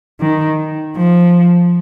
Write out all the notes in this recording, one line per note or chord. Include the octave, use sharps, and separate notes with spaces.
D#3
F3